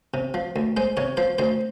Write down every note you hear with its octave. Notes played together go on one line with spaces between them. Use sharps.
C3
F3
D2
G#3 C5
C3 C#5
F3 C5
D2 C5